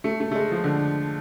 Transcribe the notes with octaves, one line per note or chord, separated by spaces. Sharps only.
A3
A3
A3
G#3
F3
D3